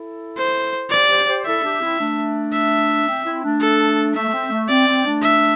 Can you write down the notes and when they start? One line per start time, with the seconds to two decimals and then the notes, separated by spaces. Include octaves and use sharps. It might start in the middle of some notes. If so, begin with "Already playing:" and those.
Already playing: E4 A4
0.37 C5
0.91 G4 C5 D5
1.09 G4 C5
1.27 G4 C5
1.45 E4 A4 E5
1.63 D4 G4
1.81 C4 E4
1.99 A3 D4
2.53 E5
3.07 C4
3.24 C4 E4
3.43 A3 D4
3.61 A4
4.15 A3 E5
4.27 A3
4.32 C4
4.51 A3
4.69 C4 D5
4.87 C4
5.04 A3 D4
5.22 E5